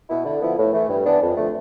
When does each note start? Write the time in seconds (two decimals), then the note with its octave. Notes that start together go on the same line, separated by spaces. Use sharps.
0.10 B2 B3 E4
0.25 D3
0.41 F3 B3 E4
0.58 A2
0.73 E3 A3
0.89 G2
1.06 E3 B3 D4
1.22 F2
1.37 D3 F3 A3